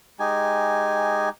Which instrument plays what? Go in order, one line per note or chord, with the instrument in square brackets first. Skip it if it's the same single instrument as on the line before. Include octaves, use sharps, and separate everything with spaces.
[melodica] G#3 D#4 G4 G#5